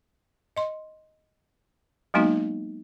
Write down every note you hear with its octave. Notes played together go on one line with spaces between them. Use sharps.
D#5 C6
F#3 G#3 A#3 B3 D#4 F#4